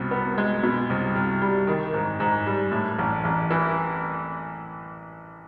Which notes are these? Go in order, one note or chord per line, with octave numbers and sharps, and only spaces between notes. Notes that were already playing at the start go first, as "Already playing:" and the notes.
Already playing: C2 B2
B3
G#3
B2
C2
C2
G3
D#3
G#2
G#2
G3
A2
A1
A1
E3